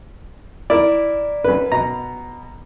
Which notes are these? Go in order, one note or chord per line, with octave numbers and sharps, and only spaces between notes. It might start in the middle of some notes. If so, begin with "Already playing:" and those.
E4 A#4 D5
F#2 B4
B2 A#5